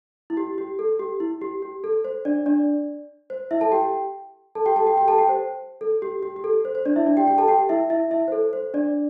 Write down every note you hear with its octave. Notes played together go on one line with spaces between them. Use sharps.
E4
G4
G4
A4
G4
E4
G4
G4
A4
C5
D4 D5
D4 D5
C5
E4 E5
A4 A5
G4 G5
A4 A5
G4 G5
A4 A5
G4 G5
G4 G5
A4 A5
G4 G5
C5
A4
G4
G4
G4
A4
C5
C5
D4 D5
E4 E5
D4 D5
G4 G5
G4 G5
A4 A5
G4 G5
E4 E5
E4 E5
E4 E5
C5
A4
C5
D4 D5